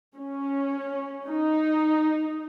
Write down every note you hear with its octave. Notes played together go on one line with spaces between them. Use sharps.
C#4
D#4